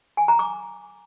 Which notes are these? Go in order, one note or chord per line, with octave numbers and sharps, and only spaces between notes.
G#5
A#5
D6